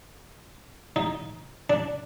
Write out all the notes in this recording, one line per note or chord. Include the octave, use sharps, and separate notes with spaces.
D#4
D4